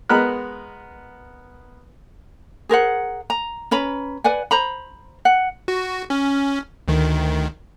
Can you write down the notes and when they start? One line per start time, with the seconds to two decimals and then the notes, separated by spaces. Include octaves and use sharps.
0.09 G#3 B3 A#4 B5 F#6
2.69 G#4 A#4 C5 F#5
3.30 A#5
3.71 C#4 B4 A#5 B5
4.24 B4 D5 F#5 G#5
4.51 C5 A#5 B5
5.25 F#5
5.68 F#4
6.10 C#4
6.88 D2 D#3